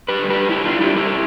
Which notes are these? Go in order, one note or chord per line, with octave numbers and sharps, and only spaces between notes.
G4 B4
D3 G3
G4 B4
G2 E4 G4
D4 F4
D3 G3 E4 G4
E4 G4